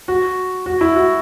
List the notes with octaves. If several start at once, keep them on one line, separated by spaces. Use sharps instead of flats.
F#4
F#4
E4
F#4